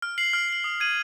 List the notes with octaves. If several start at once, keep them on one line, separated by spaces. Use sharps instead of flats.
F6
C7 F#7
F6
C7 F#7
D#6
G#6 D#7 F#7